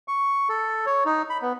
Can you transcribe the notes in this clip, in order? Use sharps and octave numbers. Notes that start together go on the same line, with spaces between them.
C#6
A4
C#5
D#4
B5
B3